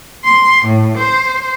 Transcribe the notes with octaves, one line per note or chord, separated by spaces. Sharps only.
C6
A2
C5